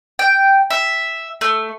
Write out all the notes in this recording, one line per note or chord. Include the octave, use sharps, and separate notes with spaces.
G5
E5
A3